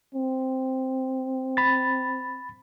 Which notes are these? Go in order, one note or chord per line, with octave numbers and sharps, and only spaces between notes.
C4
B5 A6